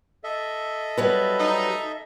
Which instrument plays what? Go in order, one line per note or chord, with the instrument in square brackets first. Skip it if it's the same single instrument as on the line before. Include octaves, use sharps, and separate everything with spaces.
[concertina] A4 D#5 E5
[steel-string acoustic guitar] F#3 G3 B4
[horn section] D#4